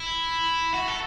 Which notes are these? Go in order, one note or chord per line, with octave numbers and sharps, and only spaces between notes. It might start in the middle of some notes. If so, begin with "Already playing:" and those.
Already playing: E4
F#4
A4